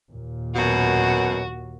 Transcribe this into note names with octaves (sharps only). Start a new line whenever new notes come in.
D#2 A#2
F#2 B2 F#4